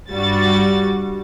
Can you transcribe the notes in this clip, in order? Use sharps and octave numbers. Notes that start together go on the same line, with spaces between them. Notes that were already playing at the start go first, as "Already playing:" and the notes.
G2 G3 F#4 A6